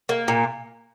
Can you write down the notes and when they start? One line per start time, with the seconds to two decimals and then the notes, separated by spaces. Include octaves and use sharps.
0.09 A#3
0.28 A#2